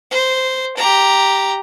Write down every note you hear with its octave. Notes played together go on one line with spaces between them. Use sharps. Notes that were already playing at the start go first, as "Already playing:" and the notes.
C5
G4 A#5